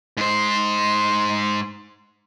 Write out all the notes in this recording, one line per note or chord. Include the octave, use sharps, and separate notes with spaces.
G#2 C5